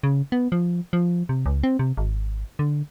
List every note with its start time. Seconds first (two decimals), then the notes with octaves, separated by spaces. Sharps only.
0.03 C#3
0.32 B3
0.52 F3
0.93 F3
1.29 C3
1.46 C#2
1.63 C4
1.79 C3
1.97 G#1
2.59 D3